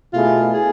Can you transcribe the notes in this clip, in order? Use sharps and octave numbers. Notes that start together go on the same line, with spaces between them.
B2 A3 E4 F4 G#4
G#4